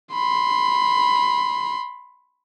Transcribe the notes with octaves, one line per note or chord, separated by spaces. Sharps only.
B5 C6